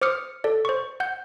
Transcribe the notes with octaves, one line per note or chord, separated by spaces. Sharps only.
C5 D6 D#6 F6 C#7
A4 D5
C5 C#6
F#5 G6